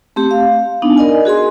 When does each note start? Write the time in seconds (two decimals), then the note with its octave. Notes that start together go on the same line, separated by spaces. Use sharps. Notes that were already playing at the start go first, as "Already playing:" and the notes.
0.16 A3 C4 G4
0.31 F5
0.82 B3 D4 D#4
0.98 A#4 D5 D#5 G#5
1.25 F#4 G#4 G#5 C6